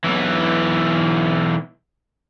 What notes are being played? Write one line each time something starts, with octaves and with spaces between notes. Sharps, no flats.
B1 E3